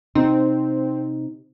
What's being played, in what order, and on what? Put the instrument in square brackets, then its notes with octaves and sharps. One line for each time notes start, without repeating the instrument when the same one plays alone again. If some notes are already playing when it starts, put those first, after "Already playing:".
[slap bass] C3 [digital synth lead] C4 [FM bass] D#4